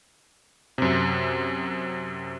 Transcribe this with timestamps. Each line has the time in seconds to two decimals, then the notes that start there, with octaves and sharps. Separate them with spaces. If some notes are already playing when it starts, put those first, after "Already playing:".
0.78 F#2 C3